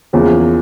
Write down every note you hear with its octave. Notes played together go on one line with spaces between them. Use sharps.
E2 C#3 F3 A#3 C#4